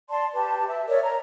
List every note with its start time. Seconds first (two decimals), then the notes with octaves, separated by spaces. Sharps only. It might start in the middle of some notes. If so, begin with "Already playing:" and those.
0.09 D5 A5 C6
0.34 G4 B4 A5
0.67 E5
0.88 A#4 C#5 D5 E5
1.02 A#5